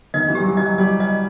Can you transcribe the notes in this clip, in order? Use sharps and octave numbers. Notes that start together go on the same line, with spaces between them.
D#3 D#5
E3
G3 G4
F#3
F#3 D#5
G3 D#5
D#5